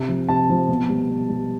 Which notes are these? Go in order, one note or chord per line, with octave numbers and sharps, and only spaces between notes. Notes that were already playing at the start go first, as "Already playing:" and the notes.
Already playing: C3
F3
C3 A5
F3
B2
G3
B2
G3